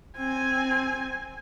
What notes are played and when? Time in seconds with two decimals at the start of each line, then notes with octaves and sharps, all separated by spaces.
0.17 C4 G#5